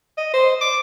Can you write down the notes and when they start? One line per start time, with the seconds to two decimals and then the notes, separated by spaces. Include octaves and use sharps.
0.17 D#5
0.34 C5
0.61 D6